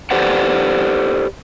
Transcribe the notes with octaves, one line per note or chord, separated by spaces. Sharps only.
G4 A4 B4 C5 D5 F#5